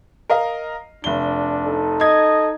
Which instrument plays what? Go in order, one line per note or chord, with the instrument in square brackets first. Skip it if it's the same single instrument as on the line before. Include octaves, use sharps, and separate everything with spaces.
[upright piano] A#4 D#5 F5
[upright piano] F1 G7 [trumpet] D4
[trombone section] D#4 A4
[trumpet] D#5 [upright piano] G#6